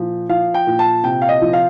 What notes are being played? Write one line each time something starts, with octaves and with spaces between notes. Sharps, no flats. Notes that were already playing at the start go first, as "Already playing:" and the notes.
Already playing: A#2 F3
F3 F5
G5
A#2
A5
C3 G5
F5
D#5
F3
F5